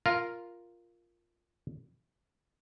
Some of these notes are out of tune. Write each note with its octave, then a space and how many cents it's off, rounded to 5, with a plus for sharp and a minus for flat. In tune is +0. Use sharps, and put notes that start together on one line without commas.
F4 -5 A#4 +0